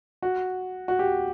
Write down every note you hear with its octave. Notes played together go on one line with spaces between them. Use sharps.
F#4
F#4
G4